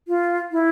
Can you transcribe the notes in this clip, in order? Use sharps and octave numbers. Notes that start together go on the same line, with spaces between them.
F4
E4